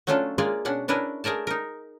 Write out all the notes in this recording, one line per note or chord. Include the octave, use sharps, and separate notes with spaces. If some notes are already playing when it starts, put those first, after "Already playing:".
F#3 A3 C#4 D4 F4 A4
G#3 A#3 F4 G#4 D5 F5
B2 C#4 D4 F#5
C#4 D4 E4 A#4 B4
A3 G#4 A#4 D5 A5
D#4 A#4